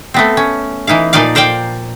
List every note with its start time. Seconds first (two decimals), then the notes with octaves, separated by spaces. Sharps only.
0.14 A3 B3 C4
0.37 C#4
0.87 E3 D#4 E4 F5
1.13 A#2 F3 D#4 D5 F5
1.35 A#4 C5 D5 F5 G5